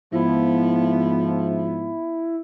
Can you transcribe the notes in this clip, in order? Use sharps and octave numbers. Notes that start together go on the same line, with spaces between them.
G#2 F3 B3 E4